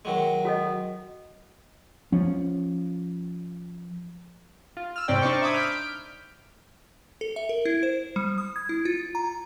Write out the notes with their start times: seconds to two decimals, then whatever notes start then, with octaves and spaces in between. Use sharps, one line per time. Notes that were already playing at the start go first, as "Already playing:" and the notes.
0.05 D#3 F#3 G#3
0.45 F#4 A4 D#5
2.12 F3 C#4
4.77 F4
4.96 E6 F6
5.08 G#2 C3 C4 C#4 D5 G5
5.21 D4 D#4 C5 D5 C#6 D6
5.42 E5 B5 D6 D#6 G#6
5.54 F6 G6 B6 D7
7.21 A4
7.36 E5
7.49 A#4
7.65 E4
7.83 C5
8.16 G3
8.38 D#6
8.56 G#6
8.69 E4
8.85 F4
9.15 A#5